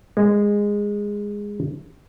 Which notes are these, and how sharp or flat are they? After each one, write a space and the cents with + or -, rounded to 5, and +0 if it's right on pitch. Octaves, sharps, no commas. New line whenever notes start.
G#3 -15